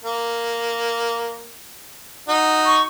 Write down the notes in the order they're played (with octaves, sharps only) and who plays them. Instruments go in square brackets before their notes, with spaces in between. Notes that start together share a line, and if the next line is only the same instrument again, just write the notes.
[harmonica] A#3
D#4 F#4
[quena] C#6